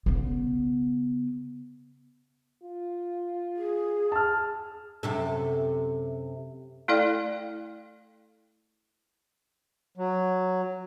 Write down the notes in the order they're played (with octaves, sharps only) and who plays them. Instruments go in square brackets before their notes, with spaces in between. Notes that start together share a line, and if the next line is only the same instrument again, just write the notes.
[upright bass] C#3 B3
[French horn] F4
[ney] G#4
[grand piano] A5 F6
[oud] F#2 C3 A4
[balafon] A3 E4 A4 D5 F5 G5
[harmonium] F#3